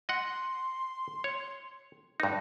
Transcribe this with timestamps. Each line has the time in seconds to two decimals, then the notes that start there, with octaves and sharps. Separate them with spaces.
0.09 D#5 F#5 C6
1.24 C#5
2.20 G2 D#4 B4